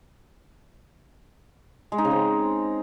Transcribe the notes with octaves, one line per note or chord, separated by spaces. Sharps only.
G#3
D#4
C#3
C4